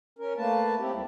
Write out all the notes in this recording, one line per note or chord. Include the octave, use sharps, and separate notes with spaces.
C#4 A#4
A3 A#3 B4 A5
C4 E4 G4
D2 G3 C4 E4